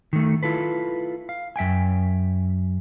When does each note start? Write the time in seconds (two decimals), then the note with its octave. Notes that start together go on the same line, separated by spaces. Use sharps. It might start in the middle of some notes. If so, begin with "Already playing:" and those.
0.13 D#3 A3
0.43 E4 F4 A4 B4
1.29 F5
1.56 F#2 E5 G5 G#5